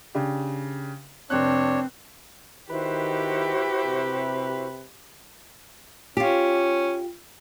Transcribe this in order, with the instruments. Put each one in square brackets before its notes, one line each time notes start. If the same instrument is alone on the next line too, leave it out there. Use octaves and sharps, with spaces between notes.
[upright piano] C#3 D4 G4
[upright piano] F1 F#6 [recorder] C4 [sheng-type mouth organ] D4 C#5
[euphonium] D#3 [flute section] E4 F#4 C5 [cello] G4 [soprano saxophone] B4
[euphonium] C3
[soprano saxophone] C#4 [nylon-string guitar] F4 G4